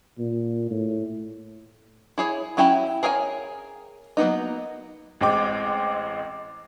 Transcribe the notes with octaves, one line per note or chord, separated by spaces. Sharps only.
A#2
A2
E4 G#4 C#5
F#3 C#4 E4 G4 B5
G#4 A#4 C#5 D#5 G#5
F#3 A#3 B3 D#4
A1 G#3 C4 G5 D6